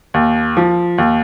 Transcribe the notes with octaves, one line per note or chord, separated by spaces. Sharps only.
D#2
F3
D#2